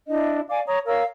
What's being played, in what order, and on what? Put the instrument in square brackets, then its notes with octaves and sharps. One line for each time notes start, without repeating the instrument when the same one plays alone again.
[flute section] D4 E4 D#5
D5 F5 G#5 D6
C#5 A#5 D#6
A#4 C#5 F5 E6